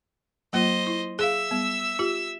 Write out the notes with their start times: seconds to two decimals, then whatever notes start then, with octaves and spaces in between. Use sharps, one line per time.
0.53 F#3 A#3 F4 C5 D#5
0.87 E4
1.19 G#4 E5 F5 E6
1.51 G3 B3
1.99 F4 G4